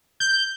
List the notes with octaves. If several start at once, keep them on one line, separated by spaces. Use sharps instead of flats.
G6